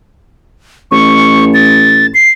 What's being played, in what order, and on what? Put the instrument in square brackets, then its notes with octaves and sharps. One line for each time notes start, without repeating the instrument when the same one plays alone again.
[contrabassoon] A1 [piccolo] C#6
[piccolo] A6
C7